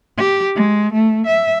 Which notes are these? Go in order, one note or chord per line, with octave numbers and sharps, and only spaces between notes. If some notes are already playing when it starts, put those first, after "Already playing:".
G4
G#3
A3
E5